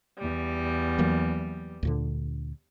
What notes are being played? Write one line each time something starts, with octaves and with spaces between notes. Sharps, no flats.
E2 G3
E3 F#3 A#3
D2 A#2 D3